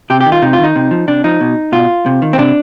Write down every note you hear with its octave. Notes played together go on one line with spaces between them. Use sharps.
C3 G4
G4
D#3
F4
C3 D#4
F4
D#3 D#4
C3
F3
C3 D4
F3 D#4
B2
B2 F4
C3
D#3
C4
C3 D4